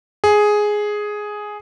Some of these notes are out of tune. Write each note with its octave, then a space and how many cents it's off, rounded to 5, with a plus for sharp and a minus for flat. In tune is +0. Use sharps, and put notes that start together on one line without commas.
G#4 +5